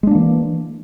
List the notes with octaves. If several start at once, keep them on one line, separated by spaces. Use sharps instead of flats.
E3 G#3 A#3 D4